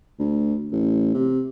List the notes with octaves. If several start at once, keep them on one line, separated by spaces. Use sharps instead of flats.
D2
A1
C3